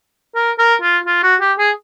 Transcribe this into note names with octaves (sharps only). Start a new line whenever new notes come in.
A#4
A#4
F4
F4
F#4
G4
G#4